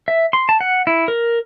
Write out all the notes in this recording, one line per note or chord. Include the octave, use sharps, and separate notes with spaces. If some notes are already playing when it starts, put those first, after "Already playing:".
E5
C6
A5
F#5
E4
A#4